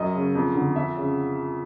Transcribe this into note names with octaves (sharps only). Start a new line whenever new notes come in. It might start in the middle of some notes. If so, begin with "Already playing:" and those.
Already playing: F#2 D#5
C#3
F2
D3
F2 E5
C#3